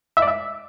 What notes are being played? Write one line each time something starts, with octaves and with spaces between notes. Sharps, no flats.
E5
D5
E5